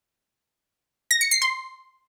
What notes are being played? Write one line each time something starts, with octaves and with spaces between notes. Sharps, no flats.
A#6
C#7
C7
C6